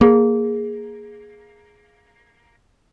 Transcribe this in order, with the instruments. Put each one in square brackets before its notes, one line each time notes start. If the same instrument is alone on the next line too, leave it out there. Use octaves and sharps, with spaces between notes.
[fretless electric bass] A#3 [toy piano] G#4